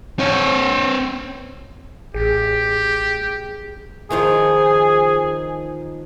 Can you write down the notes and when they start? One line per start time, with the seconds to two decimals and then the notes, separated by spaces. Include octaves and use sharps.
0.19 C4 C#5
2.14 A1 G4 G#4
4.11 D#3 F3 F4 G#4